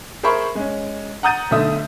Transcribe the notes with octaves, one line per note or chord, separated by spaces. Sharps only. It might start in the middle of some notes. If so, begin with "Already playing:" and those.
G#4 A#4 C5 E5 B5 C#6
G#3 C#4
F#5 A#5 D#6 G6 A6 D#7
B1 D3 A3 E5 D#6